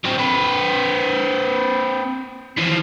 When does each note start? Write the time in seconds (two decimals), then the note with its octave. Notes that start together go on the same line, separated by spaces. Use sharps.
0.05 F#3 C4
0.19 C4 B4
2.58 E3 F3